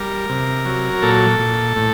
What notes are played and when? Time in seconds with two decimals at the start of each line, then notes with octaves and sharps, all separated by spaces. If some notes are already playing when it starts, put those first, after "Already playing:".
Already playing: G3 A#4
0.29 C3
0.66 F#3
1.02 A#2 A4
1.39 A#2
1.76 A2